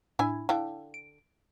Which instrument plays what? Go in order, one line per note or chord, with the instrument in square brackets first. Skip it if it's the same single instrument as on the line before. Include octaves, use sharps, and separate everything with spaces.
[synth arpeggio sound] A2 D4 G#6 [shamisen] E4 G#5
[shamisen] D3 G5 [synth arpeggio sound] E4 F5
[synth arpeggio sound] D7